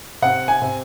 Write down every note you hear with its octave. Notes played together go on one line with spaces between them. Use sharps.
C3 F#5
G#5
C3